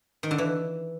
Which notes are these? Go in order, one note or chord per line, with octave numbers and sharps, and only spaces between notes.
D#3
D3
E3